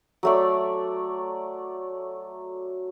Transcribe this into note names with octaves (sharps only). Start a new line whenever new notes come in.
F#3 A3 D5